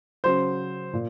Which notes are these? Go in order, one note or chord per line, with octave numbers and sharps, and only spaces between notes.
C#3 F#3 C5
A#2